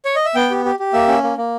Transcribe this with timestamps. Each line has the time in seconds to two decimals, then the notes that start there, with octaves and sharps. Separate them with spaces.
0.05 C#5
0.16 D#5
0.25 E5
0.35 B3 G5
0.50 G4
0.65 G4
0.79 G4
0.93 A#3 E5
1.08 C#4
1.23 A#3
1.38 A#3